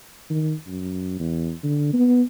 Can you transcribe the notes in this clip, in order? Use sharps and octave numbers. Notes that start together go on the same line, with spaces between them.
D#3
F#2
E2
D3
B3